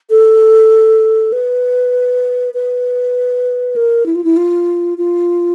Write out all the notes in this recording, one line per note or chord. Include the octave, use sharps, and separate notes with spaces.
A4
B4
B4
A#4
E4
F4
E4
F4
F4